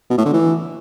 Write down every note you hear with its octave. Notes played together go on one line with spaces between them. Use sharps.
B2
A2
D3
E3